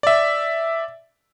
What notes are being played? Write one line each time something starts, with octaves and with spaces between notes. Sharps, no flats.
D5 E5